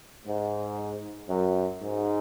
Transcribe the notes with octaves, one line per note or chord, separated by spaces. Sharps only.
G#2
F#2
G#2